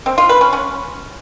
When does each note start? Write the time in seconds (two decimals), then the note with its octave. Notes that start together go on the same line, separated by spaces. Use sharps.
0.06 C4
0.18 F4
0.29 B4
0.41 C#4
0.53 C#4